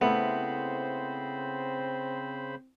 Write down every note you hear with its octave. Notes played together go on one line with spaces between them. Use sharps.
C#3 A3 B3 C4 E4 C5 B5